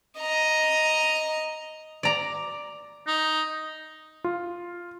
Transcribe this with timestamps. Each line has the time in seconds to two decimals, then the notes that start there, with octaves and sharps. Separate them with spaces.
0.20 D#5 A#5
2.03 D5 A#5
3.07 D#4
4.24 F4